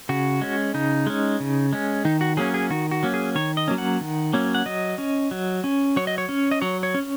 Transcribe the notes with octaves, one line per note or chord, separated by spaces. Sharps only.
C#3 F#4
G#3 C#4
C#3 D#4
G#3 C#4
C#3
G#3 C#4
D#3 D#4
F#4
F#3 A#3 C#4 G#4
G#4
D#3 F#4
F#4
F#3 A#3 C#4
G#4
D#3 C#5
D#5
F#3 A#3 C#4
F#5
D#3
F#3 A#3 C#4
F#5
F#3 D#5
C#4
F#3
C#4
F#3 C#5
D#5
C#5
C#4
D#5
F#3 C#5
C#5
C#4